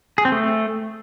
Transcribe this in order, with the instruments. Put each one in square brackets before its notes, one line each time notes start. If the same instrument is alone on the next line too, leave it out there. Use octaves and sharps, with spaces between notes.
[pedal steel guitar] G#4
C4
A3